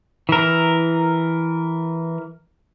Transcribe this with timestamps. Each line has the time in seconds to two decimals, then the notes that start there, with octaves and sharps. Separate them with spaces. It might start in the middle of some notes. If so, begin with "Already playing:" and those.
0.29 E3 A#4